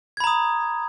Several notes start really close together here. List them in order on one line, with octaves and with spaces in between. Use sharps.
G#6 B5 A#5 D#6